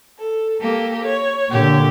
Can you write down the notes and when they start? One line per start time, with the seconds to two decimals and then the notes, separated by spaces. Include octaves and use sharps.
0.18 A4
0.60 A#3 G4 A4
1.04 C#5
1.50 A#2 D3 G4